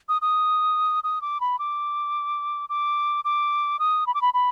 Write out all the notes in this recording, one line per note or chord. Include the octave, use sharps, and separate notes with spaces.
D#6
D#6
D#6
D6
B5
D6
D6
D6
D#6
B5
D6
B5
B5